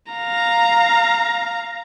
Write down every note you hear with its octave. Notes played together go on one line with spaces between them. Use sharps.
F5 A#5